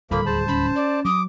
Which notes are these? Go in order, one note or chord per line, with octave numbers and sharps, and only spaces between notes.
D1 D#2 F3 G3 A#3 A4 B5
G#4 C5 A5
C#4 B5
D5
F#3 D6 D#6